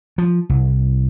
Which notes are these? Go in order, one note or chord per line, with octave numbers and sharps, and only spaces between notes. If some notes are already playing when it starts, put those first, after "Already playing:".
F3
C2